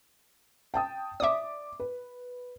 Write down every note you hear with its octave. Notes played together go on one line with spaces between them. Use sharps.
G5 A5 D#6
D5 E5 D6 D#6
B4